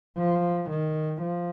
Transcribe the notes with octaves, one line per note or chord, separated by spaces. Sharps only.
F3
D#3
F3